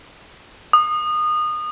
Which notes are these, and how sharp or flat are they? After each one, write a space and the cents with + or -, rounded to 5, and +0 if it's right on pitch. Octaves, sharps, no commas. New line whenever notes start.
D#6 -25